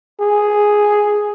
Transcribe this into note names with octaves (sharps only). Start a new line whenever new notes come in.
G#4